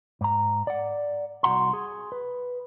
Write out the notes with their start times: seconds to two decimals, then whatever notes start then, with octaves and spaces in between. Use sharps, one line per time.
0.21 G#2 A#5
0.67 D5 F#5
1.43 C2 B2 F#4 F#5 A#5 C6
1.73 G#4
2.12 B4